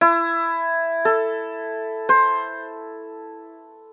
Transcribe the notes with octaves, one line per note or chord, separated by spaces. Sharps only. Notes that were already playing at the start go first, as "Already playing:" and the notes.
E4
A4
C5